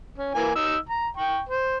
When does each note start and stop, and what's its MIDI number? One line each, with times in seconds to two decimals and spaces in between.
0.18 0.32 61
0.35 0.51 52
0.35 0.51 58
0.35 0.51 80
0.55 0.76 63
0.55 0.76 88
0.89 1.07 82
1.17 1.40 79
1.17 1.40 85
1.49 1.77 72